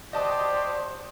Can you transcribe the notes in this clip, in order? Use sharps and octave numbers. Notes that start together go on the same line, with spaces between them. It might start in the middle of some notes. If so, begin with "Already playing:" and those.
F#4 G4 C5 D5 D#5 A5 D#6